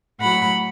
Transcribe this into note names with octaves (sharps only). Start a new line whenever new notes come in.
A2 F#3 F#5 B5